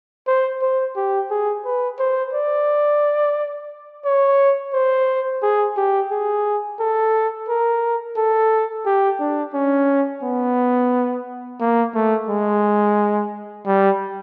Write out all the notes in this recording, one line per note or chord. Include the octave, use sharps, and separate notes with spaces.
C5
C5
G4
G#4
B4
C5
D5
C#5
C5
G#4
G4
G#4
A4
A#4
A4
G4
D4
C#4
B3
A#3
A3
G#3
G3